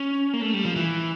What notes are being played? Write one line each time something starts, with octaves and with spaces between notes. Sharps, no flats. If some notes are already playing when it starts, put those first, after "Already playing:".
Already playing: C#4
A#3
A3
G3
F3
E3